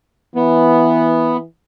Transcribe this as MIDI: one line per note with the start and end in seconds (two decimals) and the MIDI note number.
0.36 1.46 52
0.36 1.37 59